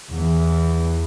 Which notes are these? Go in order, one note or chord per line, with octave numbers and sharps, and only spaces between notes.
E2 E3